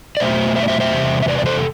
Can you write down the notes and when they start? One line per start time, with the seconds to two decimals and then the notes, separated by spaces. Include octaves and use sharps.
0.17 D5
0.20 B2 F#3 A3 C5 E5
0.56 C5 E5
0.63 D5
0.68 C5 E5
0.80 C5 E5
0.92 E2 C3 G3
1.22 E5
1.28 B4 D5
1.39 D5
1.46 A4 C5